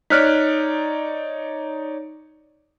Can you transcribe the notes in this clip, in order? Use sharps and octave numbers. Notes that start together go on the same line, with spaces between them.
D#4 C#5 D5 F6 F#6 B6